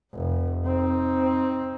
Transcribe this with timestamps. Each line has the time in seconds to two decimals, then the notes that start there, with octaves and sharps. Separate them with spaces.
0.13 F1
0.65 C4 D#4